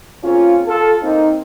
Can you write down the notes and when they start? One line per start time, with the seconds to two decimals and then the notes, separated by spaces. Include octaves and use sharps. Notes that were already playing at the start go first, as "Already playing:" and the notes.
0.23 C#3 A#3 C4 C#4 F4
0.67 F4 A4
1.03 A#3 C4 D#4